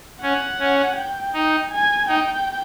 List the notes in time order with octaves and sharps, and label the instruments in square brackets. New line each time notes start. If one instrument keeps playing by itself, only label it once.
[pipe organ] C#4 [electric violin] F#5
[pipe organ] C#4
[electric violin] G5
[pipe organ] D#4
[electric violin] G#5
[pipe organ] D#4 [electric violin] G5